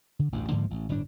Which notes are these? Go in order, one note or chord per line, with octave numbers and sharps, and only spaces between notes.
D3
A1 D2 G2
G#2 D3 F3 A#3
A1
G1 A2 G3 D4